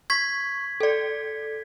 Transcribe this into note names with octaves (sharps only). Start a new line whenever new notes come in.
C#6 G#6 B6
A4 D5